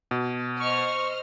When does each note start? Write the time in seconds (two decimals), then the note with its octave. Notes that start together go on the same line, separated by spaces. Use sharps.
0.11 B2
0.60 C5 D#5 C#6 F6